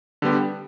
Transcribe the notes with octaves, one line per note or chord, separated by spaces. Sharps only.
D3 G3 B3 G4